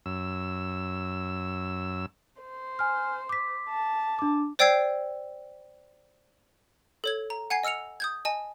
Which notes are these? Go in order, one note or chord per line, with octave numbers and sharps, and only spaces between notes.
F#2 E6
C5
G#5 F6
D6 B6
A5
D4 D6
C5 D5 G5 E6 G#6 C7
A4 C#5 G#6
A#5
F#5 G#5 G#6 C7
D#5 E6 F6 C#7 F7
D#6 G6 G#6
D#5 G#5 A5